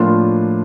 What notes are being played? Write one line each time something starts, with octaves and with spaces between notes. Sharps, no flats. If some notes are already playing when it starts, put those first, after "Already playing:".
Already playing: A2 F3 A#3 D4 F4